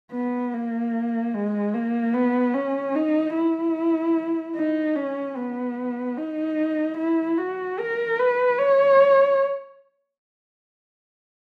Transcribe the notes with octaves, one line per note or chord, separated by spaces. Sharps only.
B3
A#3
G#3
A#3
B3
C#4
D#4
E4
D#4
C#4
B3
D#4
E4
F#4
A#4
B4
C#5